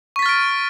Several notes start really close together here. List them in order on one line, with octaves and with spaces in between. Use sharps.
C#6 B6 A6 F6 D7